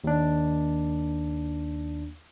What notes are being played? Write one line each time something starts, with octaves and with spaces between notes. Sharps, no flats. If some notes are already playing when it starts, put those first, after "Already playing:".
D#2 D4